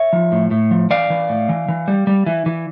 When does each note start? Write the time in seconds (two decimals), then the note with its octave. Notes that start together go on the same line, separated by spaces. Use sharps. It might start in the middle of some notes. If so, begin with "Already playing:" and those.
Already playing: C#5 E5
0.13 F3
0.32 A2
0.51 A2
0.71 F3
0.90 E3 D5 F5
1.10 E3
1.29 A2
1.49 E3
1.68 E3
1.88 G3
2.07 G3
2.26 E3
2.46 E3